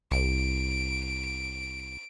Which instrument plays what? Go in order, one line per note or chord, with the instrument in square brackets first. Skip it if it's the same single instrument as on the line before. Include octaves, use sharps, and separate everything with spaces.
[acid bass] C2 [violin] D7